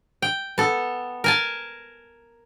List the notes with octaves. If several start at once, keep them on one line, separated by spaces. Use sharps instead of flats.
G5
B3 A4
A#4 G#5 A5